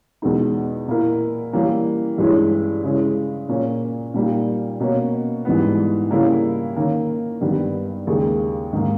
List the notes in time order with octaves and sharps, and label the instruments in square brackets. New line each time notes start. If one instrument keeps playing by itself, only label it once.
[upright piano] E2 B2 G#3 D#4
A#2 A#3 E4 A#4
E3 G3 A#3 C#4
G2 E3 G#3 C#4 E4
C#3 G#3 C#4 E4
A#2 A#3 C#4
A#2 G3 A#3 D#4
B2 A#3 C#4
G#2 E3 G3 B3
C#3 G3 A#3 C#4 E4
D#3 A#3 C#4
G2 D#3 G3 B3
D#2 C#3 G#3 D#4 G#4
G#2 D#3 A#3